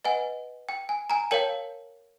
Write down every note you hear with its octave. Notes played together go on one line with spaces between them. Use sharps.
B4 D#5 F#5 G#5
G5
G#5
G#5 A#5
A#4 C#5 F5 G5 A5